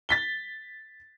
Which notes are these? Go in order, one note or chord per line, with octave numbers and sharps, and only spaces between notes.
A6 B6 G7